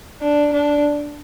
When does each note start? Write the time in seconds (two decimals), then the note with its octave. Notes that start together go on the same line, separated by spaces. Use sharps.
0.22 D4
0.53 D4